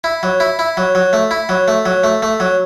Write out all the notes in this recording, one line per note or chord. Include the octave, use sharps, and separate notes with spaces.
E4
F#3
E4
E4
F#3
F#3
A3
E4
F#3
A3
F#3
A3
A3
F#3